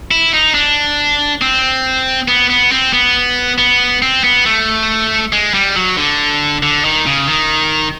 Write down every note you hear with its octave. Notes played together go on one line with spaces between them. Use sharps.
E4
D#4
D4
C4
B3
B3
C4
B3
B3
C4
B3
A3
G#3
G3
F#3
D3
D3
D#3
C#3
D#3